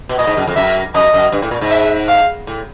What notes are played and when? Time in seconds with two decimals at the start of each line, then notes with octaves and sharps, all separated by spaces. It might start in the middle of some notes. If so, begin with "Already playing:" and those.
0.09 B2
0.18 A#2 D#5
0.27 G#2
0.37 F#2
0.47 F2
0.56 F#2 E5
0.95 F#2 D#5
1.14 F#2
1.32 G2
1.42 A2
1.51 A#2
1.61 G#2
1.71 E5
2.08 F5
2.47 A2